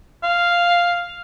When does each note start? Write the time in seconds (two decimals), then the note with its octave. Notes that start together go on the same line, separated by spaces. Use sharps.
0.23 F5